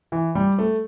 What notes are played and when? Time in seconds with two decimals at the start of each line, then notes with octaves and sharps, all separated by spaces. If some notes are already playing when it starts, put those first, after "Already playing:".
0.12 E3
0.35 G3
0.59 A3